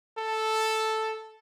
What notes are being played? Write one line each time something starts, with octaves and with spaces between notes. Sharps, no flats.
A4